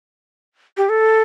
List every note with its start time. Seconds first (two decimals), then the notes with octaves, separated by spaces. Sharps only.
0.77 G4
0.89 A4